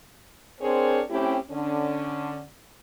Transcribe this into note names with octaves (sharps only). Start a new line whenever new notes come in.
C4 D4 G#4 A#4 C5 C#5
A3 C4 C#4 E4 G4
D3 C#4 D4